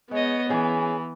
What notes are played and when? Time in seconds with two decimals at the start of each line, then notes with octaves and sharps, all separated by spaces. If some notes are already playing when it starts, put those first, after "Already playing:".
0.11 G#3 B3 C#5 D#5
0.49 E3 C#4 G#4 G#5